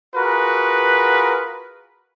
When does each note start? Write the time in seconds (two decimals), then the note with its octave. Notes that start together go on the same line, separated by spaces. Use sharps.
0.15 F4 F#4 G#4 A#4 B4